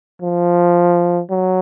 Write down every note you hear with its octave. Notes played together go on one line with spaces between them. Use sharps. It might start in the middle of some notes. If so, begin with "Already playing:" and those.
F3
F#3